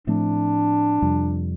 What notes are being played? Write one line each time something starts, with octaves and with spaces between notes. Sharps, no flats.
A2 F3 A3 C4 D4
F2 C3 G3